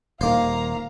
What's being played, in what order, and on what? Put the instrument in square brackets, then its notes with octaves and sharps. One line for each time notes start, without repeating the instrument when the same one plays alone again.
[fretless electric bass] D#1 D#3 [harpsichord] A#3 C5 [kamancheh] F5 A#5